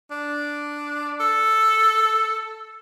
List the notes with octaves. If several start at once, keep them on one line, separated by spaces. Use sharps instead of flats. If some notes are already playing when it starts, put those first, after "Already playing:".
D4
A4